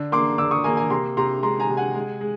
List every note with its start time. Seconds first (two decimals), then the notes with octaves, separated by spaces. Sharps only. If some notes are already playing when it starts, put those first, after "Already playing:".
Already playing: D3
0.12 A#3 C6 D6
0.38 D3 D6 E6
0.51 C#6 D#6
0.64 A#3 G#5 A#5
0.77 G#5 A#5
0.90 C3 A#5 C6
1.17 C3 A#5 C6
1.43 G#3 A#5 C6
1.60 G#5 A#5
1.69 C3
1.77 F#5 G#5
1.95 G#3
2.21 G#3